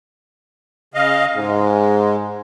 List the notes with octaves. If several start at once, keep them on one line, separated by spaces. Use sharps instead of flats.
C#3 D#5 F5
G#2 G#3